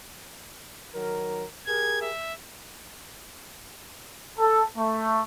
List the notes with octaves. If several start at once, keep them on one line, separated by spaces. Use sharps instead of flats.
D#3 F#3 A#4
G4 G#4 A#4 G#6
E5
A4
A3